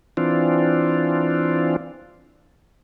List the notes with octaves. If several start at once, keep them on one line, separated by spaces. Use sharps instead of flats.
E3 C4 D4 F4